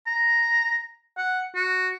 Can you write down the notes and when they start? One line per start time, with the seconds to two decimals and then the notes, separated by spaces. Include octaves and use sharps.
0.07 A#5
1.17 F#5
1.55 F#4